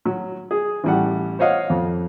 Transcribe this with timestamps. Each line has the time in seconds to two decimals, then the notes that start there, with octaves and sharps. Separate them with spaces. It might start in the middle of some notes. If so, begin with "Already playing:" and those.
0.05 F#3
0.51 G#4
0.84 A1 G3 F#5
1.39 C5 C#5 D#5 F5 F#5
1.70 F2